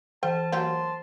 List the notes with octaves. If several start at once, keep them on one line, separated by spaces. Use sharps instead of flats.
E3 C5 G5 A5
F#3 A#3 G4 A5 C6